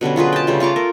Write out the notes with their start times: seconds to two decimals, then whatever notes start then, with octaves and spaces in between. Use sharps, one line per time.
0.01 B2 D3 G3 C#4
0.16 F#3 F4 G#4 B4
0.33 G5 A5
0.47 C#3 G3 A3
0.60 F4 F5 C#6 D6
0.76 A4 A#4